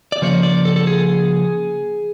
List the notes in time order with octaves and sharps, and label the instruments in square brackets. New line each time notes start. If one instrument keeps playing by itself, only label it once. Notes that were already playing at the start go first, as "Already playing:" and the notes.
[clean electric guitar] D5
C#3 F3 A#3 C#5
D5
A4
A4
G#4